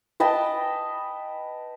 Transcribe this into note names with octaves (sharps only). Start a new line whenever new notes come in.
B4 D#5 G5 A5